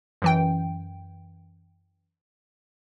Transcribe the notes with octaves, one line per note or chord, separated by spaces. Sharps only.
F#2 E3 G5